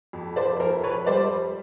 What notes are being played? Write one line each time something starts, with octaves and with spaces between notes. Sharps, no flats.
F2
C5 D5
F2 A#4 C5
B4 C#5
G3 C5 D5